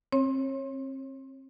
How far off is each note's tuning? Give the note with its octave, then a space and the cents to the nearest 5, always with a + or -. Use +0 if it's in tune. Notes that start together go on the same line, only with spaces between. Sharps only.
C4 +35 C#5 -25